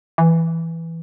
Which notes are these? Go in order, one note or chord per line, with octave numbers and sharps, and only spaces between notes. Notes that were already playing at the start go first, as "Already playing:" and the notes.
E3